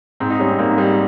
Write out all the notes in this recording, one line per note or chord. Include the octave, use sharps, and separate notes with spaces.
G#2 C4
D#4
G3 C#4
C4
G#2 A#3
G3